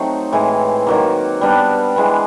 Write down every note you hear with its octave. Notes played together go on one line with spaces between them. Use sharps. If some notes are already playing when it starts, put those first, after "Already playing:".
Already playing: F#3 A3 C4 D#4
A2 E3 G#3
D#3 F#3 A#3
G3 B3 D4
E3 G#3 B3